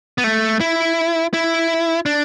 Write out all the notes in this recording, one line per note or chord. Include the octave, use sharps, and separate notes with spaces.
B3
A3
E4
E4
D4